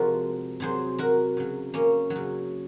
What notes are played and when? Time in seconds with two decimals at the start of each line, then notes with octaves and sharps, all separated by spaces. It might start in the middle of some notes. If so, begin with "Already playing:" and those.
Already playing: C3 F3 G#3 F#4 A#4
0.60 C3 F#3 G#4 C5
0.98 F#4 A#4
1.37 C#3 F#3
1.74 A#3 C#4
2.10 F#3
2.16 C#3